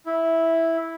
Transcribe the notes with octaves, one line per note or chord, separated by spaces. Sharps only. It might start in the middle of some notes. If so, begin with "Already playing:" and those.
E4